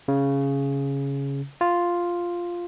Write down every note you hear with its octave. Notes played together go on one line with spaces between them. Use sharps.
C#3
F4